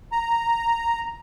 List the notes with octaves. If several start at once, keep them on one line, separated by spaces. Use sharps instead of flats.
A#5